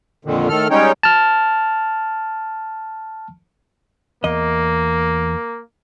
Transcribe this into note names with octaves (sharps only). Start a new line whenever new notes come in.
F2 A#2 D3 D#3
A2 D#3 A4 F6
G3 G#3 C#4 D#4 C#5 G5
A5 F6
E2 A#3 D#5